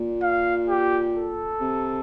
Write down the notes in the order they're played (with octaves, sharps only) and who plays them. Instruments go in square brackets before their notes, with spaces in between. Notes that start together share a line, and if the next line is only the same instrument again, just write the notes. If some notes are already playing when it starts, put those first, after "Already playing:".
Already playing: [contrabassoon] A#2
[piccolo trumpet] F5
G4
A4
[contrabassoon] C3